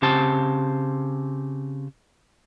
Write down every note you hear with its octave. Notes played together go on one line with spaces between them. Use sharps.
C#3 C4 G4 C5 A5